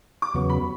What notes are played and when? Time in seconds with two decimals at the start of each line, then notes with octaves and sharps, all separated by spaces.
0.22 D6
0.34 E2 C#3 F#3 B3 C#6
0.50 B5